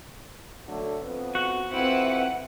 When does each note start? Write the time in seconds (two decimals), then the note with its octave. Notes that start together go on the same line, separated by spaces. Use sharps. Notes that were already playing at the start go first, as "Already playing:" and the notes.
0.67 D3 F#3 A3
1.02 F2 B3
1.35 F#4
1.72 F2 C4 E4 B4 F#5